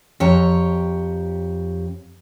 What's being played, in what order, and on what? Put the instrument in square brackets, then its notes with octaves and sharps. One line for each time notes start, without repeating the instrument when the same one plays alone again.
[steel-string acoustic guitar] F2 G4 C#5 A#5